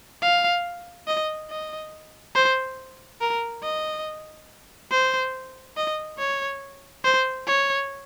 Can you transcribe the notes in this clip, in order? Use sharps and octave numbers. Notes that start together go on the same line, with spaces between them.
F5
D#5
D#5
C5
A#4
D#5
C5
D#5
C#5
C5
C#5